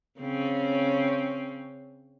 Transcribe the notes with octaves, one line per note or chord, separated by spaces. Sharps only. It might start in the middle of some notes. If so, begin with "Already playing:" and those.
C#3 C4 C#4